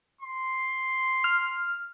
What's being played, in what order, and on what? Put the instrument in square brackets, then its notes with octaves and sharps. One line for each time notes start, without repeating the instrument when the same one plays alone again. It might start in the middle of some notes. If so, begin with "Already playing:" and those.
[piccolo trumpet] C6
[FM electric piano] F6